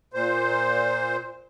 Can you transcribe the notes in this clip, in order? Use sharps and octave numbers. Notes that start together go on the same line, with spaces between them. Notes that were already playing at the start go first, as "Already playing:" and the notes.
A#2 C5